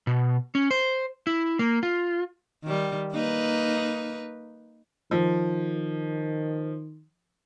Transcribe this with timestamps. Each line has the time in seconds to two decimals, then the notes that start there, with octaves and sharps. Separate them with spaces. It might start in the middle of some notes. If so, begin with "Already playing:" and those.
0.07 B2
0.55 C#4
0.71 C5
1.27 E4
1.59 A#3
1.83 F4
2.64 D#3 G3
3.12 A#3 D#4 B4
5.11 D#3 F3